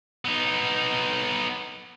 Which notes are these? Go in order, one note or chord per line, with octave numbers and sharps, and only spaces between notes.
B3 D#4